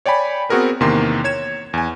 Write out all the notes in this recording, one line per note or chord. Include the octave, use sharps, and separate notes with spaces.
C#5 D5 G5 G#5 B5
B3 C4 F#4 G#4 A#4 B4
E2 C3 D#3 A#3 C6
C#5 G#6 E7
E2 G#5